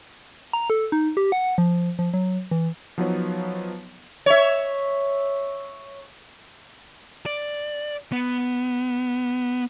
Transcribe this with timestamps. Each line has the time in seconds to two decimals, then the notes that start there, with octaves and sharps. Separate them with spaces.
0.53 A#5
0.70 A4
0.92 D#4
1.17 G4
1.32 F#5
1.58 F3
1.99 F3
2.14 F#3
2.51 E3
2.98 F3 F#3 B3 D#4 B4 C#5
4.26 C#5 E5
7.26 D5
8.12 B3